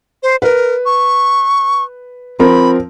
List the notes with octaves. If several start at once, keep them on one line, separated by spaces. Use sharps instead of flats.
C5
A#4 B4
C#6
F3 C4 A#4 B5